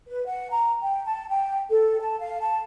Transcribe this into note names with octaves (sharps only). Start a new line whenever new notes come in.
B4
F#5
A#5
G5
A5
G5
A4
A5
F5
A5